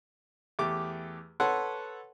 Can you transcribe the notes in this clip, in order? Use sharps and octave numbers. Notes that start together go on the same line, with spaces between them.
E2 A3 G4 D6
A4 B4 C#5 F#5 C6